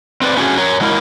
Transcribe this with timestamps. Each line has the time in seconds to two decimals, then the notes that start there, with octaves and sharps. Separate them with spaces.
0.22 C4 B4 D5
0.36 A3 C#4 F#4 G#4
0.57 A#4 C#5
0.81 F#3 G#3 A#3 E4 A#4